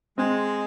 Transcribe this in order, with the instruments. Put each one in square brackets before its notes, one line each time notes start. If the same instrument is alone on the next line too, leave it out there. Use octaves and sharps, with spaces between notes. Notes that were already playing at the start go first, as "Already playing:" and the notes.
[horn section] G#3 [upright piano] C4